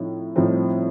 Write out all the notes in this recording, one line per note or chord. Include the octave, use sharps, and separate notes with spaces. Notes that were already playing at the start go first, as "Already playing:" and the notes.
Already playing: A2 F3 C4 D#4
A2 F3 C4 D#4